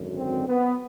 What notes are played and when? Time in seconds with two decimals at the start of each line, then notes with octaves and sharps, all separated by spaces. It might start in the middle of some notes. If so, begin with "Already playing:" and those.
Already playing: G#1 F#2 D3
0.16 C4
0.48 B3